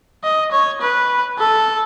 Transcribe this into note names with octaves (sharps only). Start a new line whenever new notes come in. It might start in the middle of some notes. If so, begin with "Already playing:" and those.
D#5
C#5
B4
A4